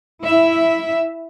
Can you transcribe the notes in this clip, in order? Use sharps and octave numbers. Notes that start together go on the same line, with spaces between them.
E4 E5